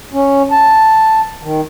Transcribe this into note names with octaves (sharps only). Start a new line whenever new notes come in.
C#4
A5
D#3